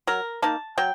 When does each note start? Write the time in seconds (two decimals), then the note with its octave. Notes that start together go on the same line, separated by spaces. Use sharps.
0.07 F#3 A#4
0.42 A#3 D#4 A5
0.78 F#3 G5